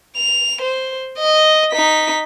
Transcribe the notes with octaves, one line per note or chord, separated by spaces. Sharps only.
F7
C5
D#5
D#4 B6